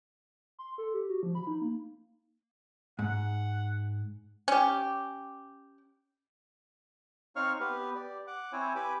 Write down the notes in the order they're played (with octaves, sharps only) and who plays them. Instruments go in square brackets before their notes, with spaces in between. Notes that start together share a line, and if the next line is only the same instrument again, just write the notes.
[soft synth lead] C6
A4
G4
F#4
F3
B5
D#4
A#3
[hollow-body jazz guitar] G#2 [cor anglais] F#5
[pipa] C#4 G4
[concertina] C4 D#4 C#5 F5 C#6 F6
B3 G4 B4
G4 D5
F#5 D6
C4 E4 C5 C#5 G#5
G4 B4 G#5 B5 D6